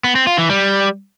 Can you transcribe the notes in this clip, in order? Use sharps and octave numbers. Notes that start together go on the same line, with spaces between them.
B3
C4
F4
E3
G3